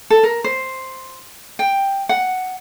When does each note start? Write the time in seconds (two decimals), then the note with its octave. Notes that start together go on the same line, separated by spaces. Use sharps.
0.10 A4
0.23 A#4
0.44 C5
1.59 G5
2.09 F#5